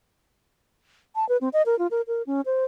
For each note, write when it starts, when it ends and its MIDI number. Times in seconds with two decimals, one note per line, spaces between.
1.15 1.27 81
1.29 1.37 71
1.41 1.49 60
1.53 1.62 75
1.66 1.78 70
1.79 1.87 65
1.91 2.01 70
2.07 2.22 70
2.27 2.41 61
2.46 2.64 72